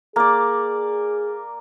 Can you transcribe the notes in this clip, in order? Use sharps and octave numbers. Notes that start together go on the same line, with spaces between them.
A#3 G#4 D5